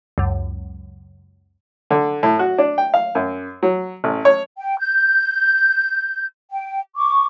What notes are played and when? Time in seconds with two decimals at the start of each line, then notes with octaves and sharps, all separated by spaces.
0.18 C#2 F#2
1.91 D3
2.23 A2
2.39 F#4
2.58 D4
2.78 G5
2.94 F5
3.15 F#2
3.63 F#3
4.04 A1
4.25 C#5
4.58 G5
4.79 G6
6.51 G5
6.96 C#6 D6